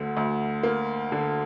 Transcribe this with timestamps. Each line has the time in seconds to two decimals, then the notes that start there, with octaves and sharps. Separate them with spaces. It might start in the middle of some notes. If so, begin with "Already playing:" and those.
Already playing: D2 D3
0.17 D2
0.63 A#3
1.12 D3